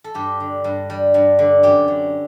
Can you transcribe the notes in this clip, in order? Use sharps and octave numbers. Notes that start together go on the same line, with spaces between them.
A4
G2 G4
D3
G2
G3
G2
D3
F#2 G4
D3